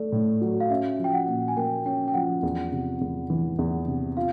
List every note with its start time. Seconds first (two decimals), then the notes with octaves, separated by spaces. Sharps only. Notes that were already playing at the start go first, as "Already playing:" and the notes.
Already playing: A3 D5
0.12 A2
0.41 F#3
0.60 F5
0.70 C#4 E5
0.99 F3
1.04 G5
1.14 F#5
1.28 A#2
1.48 G#5
1.57 A#3 G5
1.85 C#4 G5
2.08 G5
2.14 F3 F#5
2.43 E2
2.72 C3
3.01 E2
3.30 E3
3.59 E2
3.88 C3
4.17 F4 F5